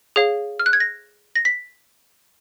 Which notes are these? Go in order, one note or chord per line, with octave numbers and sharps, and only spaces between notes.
G#4 C#5 F5
F6
F#6
G#6
A#6
A#6
B6